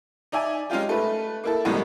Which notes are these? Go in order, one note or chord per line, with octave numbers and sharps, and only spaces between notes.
D#4 D5 E5 G#5
G#3 C#4 D#4 F4 G4
A3 B4
A#3 E4 A4
G#1 F#2 A2 G3 G#3 B3